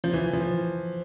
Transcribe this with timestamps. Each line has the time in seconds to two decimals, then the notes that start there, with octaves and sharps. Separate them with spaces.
0.04 F3
0.14 E3
0.33 F3